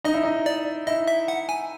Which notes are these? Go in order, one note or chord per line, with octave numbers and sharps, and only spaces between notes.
D#4 D#5
E4
D#4
D5
E4 D#5
E5
F#5
G#5